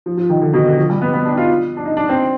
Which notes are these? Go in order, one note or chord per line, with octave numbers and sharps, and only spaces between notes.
F3
F3
D#3
D3
B2
D3
F3
G3
B3
B3
D4
D#4
F4
D4
D#4
D4
C4